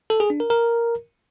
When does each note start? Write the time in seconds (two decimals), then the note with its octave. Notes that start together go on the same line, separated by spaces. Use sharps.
0.10 A4
0.20 G#4
0.30 D4
0.40 A#4
0.50 A#4